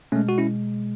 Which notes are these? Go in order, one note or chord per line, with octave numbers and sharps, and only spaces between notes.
B2 G#3 A3 C#4
F#4
C#4 E4